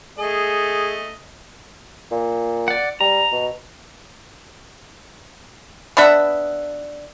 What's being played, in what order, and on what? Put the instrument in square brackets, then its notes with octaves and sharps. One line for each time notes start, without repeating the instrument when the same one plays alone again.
[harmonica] A3 D#5 [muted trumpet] G#4
[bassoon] A#2
[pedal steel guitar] D5 F#5
[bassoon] G3 [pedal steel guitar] A#5
[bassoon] B2
[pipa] B3 D4 E5 F#5